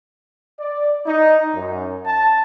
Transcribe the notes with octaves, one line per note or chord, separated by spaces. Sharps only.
D5
D#4
F#2
A5